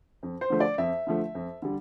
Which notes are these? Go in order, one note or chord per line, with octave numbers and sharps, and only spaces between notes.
F2
C5
D3 F3 A3
D5
F2 E5
D3 F3 A3
F2
D3 G3